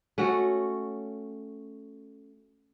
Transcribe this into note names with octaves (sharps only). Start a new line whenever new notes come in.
A3 C#4 F#4